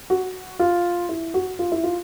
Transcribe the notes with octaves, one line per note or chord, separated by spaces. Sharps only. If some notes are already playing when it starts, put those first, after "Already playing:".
F#4
F4
E4
F#4
F4
E4
F4